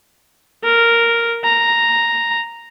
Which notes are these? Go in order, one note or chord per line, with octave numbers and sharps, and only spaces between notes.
A#4
A#5